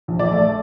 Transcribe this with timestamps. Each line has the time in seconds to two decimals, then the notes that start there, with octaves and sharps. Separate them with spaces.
0.08 A#1
0.19 D5
0.31 A3